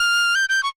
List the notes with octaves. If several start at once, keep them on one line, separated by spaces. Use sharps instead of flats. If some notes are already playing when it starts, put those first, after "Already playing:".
Already playing: F6
G6
G6
C#6